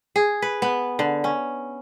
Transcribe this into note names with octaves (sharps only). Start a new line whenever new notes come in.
G#4
B4
B3
D3
C#4